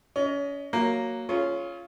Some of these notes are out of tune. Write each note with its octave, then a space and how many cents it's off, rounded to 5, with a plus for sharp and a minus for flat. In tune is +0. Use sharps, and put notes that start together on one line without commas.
C#4 +30 D#5 +0
F#3 +0 A#3 +0
C#4 +0 F4 -10 G#4 +40